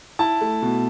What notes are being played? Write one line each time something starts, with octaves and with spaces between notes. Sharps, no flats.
E4 A5
A3
B2